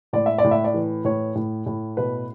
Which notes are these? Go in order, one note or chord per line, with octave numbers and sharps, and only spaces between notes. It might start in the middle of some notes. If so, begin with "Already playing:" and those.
A2 D5
E5
D5
A2
E5
D5
E3
A2 C#5
A2
A2
B2 B4